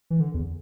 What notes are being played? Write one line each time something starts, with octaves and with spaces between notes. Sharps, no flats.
E3
D3
E2